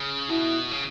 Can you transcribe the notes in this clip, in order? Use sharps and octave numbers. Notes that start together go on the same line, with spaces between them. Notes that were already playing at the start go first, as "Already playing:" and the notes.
Already playing: C#3
B2 E4
C#3